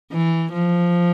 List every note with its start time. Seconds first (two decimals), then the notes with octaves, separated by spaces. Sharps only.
0.12 E3
0.53 F3